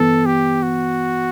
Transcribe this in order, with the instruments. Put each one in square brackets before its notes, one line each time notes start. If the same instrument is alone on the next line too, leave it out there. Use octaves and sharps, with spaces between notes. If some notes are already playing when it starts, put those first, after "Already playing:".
Already playing: [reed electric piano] G2 E3 B3 [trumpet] A4
[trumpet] G4
F#4